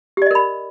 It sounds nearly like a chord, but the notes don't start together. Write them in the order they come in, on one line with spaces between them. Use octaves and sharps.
G4 D5 D#5 A#4 B5